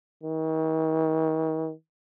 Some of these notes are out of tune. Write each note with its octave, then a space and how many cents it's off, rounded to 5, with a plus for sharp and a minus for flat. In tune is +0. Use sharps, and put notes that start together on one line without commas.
D#3 +40